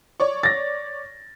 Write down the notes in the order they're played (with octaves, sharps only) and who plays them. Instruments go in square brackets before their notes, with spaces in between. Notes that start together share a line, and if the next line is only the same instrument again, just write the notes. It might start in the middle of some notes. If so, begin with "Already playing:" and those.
[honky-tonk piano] C#5 D5 C#6
[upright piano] A6 A#6